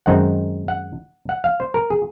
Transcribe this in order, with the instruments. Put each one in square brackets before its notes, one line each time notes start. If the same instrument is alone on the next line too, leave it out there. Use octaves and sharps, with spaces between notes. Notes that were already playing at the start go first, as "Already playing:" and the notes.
[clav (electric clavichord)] F#2 D#3 G#3 C4 D#4 F#5
F#5
F#5
F5
C5
A#4
G#4